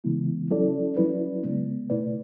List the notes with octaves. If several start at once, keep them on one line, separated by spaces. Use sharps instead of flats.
C#3 E3 G#3 B3 E4
F#3 C#4 E4 A4 D5
F#3 C#4 E4 B4 D5
C#3 G#3 B3
B2 A3 E4 B4 D5